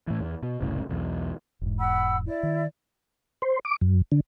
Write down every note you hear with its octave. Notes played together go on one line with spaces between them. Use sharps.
A2 E3
E2
B2
F#1 C2 A2 C#3
B1 E2
E1 G#2
F#5 B5 E6
E4 D5
D#3
C5
D6
F#2
D3